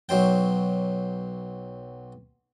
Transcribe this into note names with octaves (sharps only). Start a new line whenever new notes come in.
B1 F#3 C5 G5